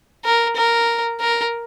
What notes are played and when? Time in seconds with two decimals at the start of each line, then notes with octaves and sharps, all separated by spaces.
0.24 A#4
0.56 A#4
1.20 A#4